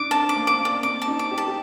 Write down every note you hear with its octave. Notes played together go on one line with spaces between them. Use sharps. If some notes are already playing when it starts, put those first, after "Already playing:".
Already playing: D4 D#4 D6
C4 A5
D6
A#3
D6
A#3
D5
C4 D6
A5
D#4
D6
G4
A5
G4